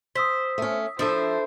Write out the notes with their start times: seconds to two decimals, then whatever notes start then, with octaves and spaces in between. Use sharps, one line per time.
0.15 C5 D#6 E6 B6
0.58 A3 C#4
0.99 F3 D4 E4 A4 C5 E5